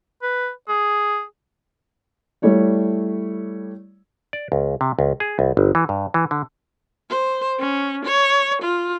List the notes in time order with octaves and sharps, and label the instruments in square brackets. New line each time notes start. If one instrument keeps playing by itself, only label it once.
[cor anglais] B4
G#4
[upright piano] G3 A3 E4 C#5 D5
[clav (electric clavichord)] D5
C#2
C3
C#2
G#4
C2
G1
E3
G2
E3
D3
[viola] C5
C#4
C#5
F4